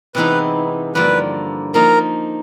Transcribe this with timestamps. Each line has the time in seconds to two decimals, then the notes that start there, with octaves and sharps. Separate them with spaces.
0.15 C3 E3 G#3 B3 D#4 B4
0.95 G2 D3 F3 A#3 B4
1.74 F3 A#3 D#4 A#4